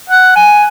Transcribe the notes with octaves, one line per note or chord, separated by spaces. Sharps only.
F#5
G#5